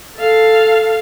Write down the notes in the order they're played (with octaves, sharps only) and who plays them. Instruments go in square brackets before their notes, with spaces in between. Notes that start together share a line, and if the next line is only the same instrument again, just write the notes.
[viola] A4 F5